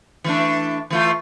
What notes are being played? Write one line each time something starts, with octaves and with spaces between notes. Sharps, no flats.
E3 A3 D4
E3 A3 F4